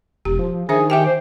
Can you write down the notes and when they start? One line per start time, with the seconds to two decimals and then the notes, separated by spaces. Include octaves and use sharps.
0.25 E1 G4
0.39 F3
0.69 D#3 D4 G#4 C5 E5
0.90 G4 E5 G5 G#5
1.06 C5